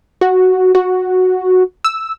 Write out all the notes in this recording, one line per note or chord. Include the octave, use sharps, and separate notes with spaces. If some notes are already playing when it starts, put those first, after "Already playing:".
F#4
F#4
E6